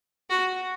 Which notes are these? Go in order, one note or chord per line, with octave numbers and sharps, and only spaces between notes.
F#4